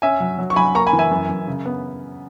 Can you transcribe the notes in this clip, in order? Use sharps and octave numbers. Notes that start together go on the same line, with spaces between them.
C#4 E5 G#5
F#3
F#3
C#6
F#3 G#5 B5
A#3 A#5 C#6
G#5 B5
E3
E5 G#5
F#2
F#2
C#3
B3